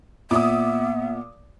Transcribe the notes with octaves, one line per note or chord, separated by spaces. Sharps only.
A#2 B3 E5 D6 D#6